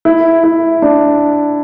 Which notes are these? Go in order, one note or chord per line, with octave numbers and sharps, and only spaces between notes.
E4
E4
D4